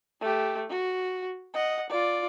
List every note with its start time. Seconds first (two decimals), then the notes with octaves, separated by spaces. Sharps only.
0.21 A3 G4
0.69 F#4
1.53 D#5 F#5
1.89 F4 D5